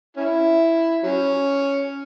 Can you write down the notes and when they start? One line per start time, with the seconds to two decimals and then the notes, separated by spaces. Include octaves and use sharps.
0.17 C#4 E4
1.03 F#3 C#4